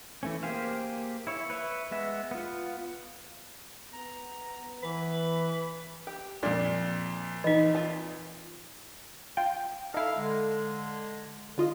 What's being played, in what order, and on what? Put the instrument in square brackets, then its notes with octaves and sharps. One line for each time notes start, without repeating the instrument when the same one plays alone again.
[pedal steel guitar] E3 A3 C#4
A#3 G4 G#4 C5 F5
E4 C#5
B4 C#5 E5
G#3 B3 E5
B3 F4
[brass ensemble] B3 [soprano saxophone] A#5
[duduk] E3 [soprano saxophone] B4
[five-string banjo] G4
[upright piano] F2 A#2 [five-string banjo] D4 A#4
[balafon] E3 D#4 [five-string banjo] D#5
[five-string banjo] F4 A5
[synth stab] F4 G5
[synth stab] D#4 E4 [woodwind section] A4 F5
[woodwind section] D3 G#3
[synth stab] D3 F4 D#5